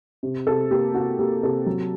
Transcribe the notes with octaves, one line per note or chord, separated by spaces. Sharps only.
C3
C3 A4
A#3 G4
C3 F#4
A#3 G4
C3 A4
F#3